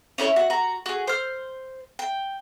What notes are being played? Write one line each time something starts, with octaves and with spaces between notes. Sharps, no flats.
C#4 E4 B4 C#5
F#4
F#4 A#5
F#4 G#4
C5 F6
G5